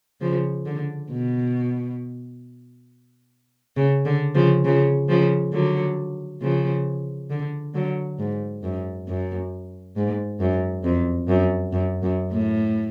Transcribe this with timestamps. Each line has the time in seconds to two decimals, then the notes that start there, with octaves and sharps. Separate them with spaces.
0.21 C#3 F3
0.66 D3
1.11 B2
3.76 C#3
4.05 D3
4.35 C#3 F3
4.65 C#3 F3
5.09 C#3 F3
5.53 D3 F#3
6.42 C#3 F3
7.30 D3
7.74 D3 F#3
8.19 G#2
8.63 F#2
9.08 F#2
9.96 G#2
10.40 F#2
10.84 F2
11.28 F#2
11.72 F#2
12.03 F#2
12.31 A2